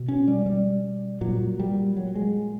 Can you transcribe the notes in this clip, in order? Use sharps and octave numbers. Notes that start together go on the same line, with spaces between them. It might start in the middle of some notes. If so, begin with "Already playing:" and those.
Already playing: B2
C#4
G3
G3
A#2 F#3
G3
F#3
G#3